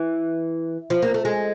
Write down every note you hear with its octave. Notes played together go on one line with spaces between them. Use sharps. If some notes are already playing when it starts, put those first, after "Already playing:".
Already playing: E3
F3
A#3
A3
G#3